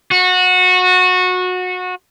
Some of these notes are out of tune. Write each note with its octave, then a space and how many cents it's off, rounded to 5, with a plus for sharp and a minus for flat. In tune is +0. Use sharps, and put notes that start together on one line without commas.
F#4 -20